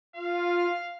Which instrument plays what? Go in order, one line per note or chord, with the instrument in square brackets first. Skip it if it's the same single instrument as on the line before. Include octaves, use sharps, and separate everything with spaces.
[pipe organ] F4 [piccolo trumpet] F5